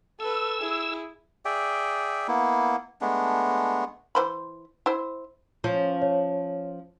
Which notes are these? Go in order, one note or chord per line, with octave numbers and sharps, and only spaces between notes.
A4 B4 E6
E4 G#4
G#4 D5 E5 G5
A#3 B3 E4
G#3 A3 B3 D4
E3 C5 B5
E4 C5
F3 C#4
C#5